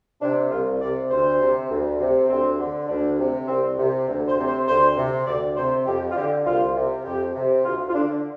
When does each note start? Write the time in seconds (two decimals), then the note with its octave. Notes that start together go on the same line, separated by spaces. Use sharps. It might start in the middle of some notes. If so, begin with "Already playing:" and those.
0.21 C3 D4
0.51 C2 F4
0.81 C3 D5
1.10 D2 C5
1.40 C3
1.70 D2
1.99 C3
2.29 D2 C4
2.59 D3
2.88 D2 D4
3.18 C3
3.48 C2 C4
3.78 C3
4.08 D2
4.28 C5
4.38 C3
4.47 C5
4.67 D2 C5
4.97 C3
5.27 D2 D5
5.56 C3 C5
5.86 F2 G4
6.11 F4
6.16 D3 G4
6.46 C2 F4
6.75 C3
7.05 F2 G4
7.35 C3
7.65 D2 F4
7.89 F4
7.94 D3 D4